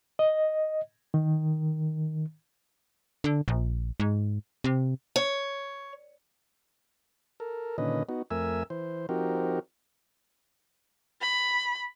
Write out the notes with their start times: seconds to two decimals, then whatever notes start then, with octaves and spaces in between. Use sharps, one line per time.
0.19 D#5
1.14 D#3
3.24 D3
3.48 A#1
4.00 G#2
4.64 C3
5.16 C#5
7.40 A4 A#4
7.78 A#2 D3 D#3 C#4 B4 D#5
8.09 B3 D#4 F#4
8.31 F2 A3 A#4 E5 G#5 E6
8.70 E3 C5
9.09 F3 C4 D#4 F#4 G4 A#4
11.21 B5